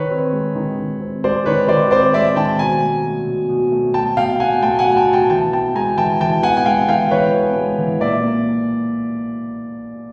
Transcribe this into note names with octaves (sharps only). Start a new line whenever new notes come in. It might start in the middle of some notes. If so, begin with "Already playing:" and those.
Already playing: D#3 B4 C#5
C4
G#3
D#3
D#3
C4
G#3 C5 D5
D#3 B4 C#5
D#3 C5 D5
C4 C5 D5
G#3 D5 E5
D#3 G5 A5
B2 G#5 A#5
A3
F#3
B2
B2
A3
F#3 G5 A5
B2 F5 G5
B2 F#5 G#5
A3 G5 A5
F#5 G#5
F#3
G5 A5
B2
G5 A5
E3 G5 A5
B3 G5 A5
G#3 G#5 A#5
E3 G5 A5
E3 G5 A5
B3 F#5 G#5
G#5
G#3 F5 G5
E3 F5 G5
E3 B4 C#5
B3
G#3
E3
A#2 D5 E5
A#3